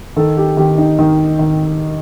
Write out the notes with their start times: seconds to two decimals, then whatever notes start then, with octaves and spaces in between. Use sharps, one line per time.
0.16 D#3 A4
0.37 G4
0.57 D#3 G4
0.78 D#4
0.99 D#3
1.39 D#3